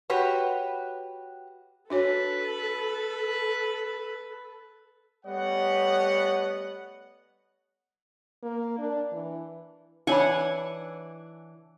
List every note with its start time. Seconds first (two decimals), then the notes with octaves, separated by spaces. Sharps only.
0.10 F#4 G4 B4 C#5
1.90 D4 F#4 A4 B4 C#5
5.26 G3 A3 B3 C#5 D#5 F#5
8.43 A#3
8.78 D4
9.13 E3
10.07 E3 D4 D#4 C#5 F#5 G#5 B5